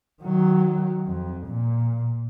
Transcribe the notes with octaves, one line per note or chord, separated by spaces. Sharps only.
D#3 F#3
F2
A#2